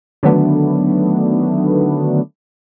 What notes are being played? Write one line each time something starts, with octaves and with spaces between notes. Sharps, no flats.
D3 D#3 F#3 A3 B3 D4